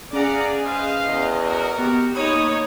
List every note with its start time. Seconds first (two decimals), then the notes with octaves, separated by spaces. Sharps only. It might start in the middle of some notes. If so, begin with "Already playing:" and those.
0.13 C#4 G#4 D5 F5 F#5 A#5
0.64 B4 C5 D#5 F5
1.05 E2
1.45 F#4 A#4
1.79 B3 G4
2.15 G#3 A#3 D#4 C#5 B5 D#6